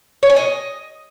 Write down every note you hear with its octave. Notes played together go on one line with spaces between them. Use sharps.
C#5
G#5
D#5